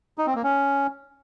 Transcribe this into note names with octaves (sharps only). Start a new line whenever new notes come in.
D#4
C4
A#3
C#4